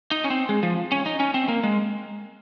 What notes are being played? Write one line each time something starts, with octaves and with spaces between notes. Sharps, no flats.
D#4
C#4
C4
G#3
F3
C#4
D#4
C#4
C4
A#3
G#3